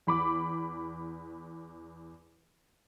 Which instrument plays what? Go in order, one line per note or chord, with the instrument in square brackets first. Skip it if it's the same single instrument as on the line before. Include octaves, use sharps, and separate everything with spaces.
[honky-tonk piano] E2 B5 D6